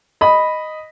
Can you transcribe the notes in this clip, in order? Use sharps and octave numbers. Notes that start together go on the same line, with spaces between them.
D#5 B5